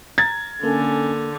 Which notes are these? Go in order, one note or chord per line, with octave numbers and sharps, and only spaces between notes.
A#5 G#6 A6
D3 A#3 C#4 A4